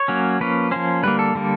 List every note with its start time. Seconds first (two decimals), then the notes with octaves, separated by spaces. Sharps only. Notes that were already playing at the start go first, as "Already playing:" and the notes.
Already playing: C#5
0.08 F#3 A#3 C#4
0.40 F3 A#3 C#4 B4
0.71 F3 A#3 C#4 C5
1.03 D3 G3 A#3 B4
1.19 A4
1.35 D3 G3 A#3